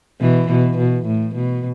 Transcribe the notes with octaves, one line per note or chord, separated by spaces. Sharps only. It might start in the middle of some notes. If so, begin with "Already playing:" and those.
B2 E3
B2
B2
A2
B2